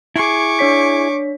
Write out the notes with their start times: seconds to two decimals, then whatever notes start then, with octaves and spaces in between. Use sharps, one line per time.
0.16 E4 G#4 C#6 D6
0.59 D4 C#5 B6